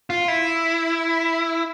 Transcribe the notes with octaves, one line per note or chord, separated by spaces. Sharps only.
F4
E4